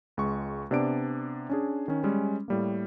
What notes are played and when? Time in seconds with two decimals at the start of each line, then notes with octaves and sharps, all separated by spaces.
0.17 C#2 G#3 C#6
0.71 C3 B3 D4 D5 D6 D7
1.50 C#4 D4 G#4
1.88 D#3 C#4
2.04 G3 G#3 C#4
2.48 A2 G3 A#3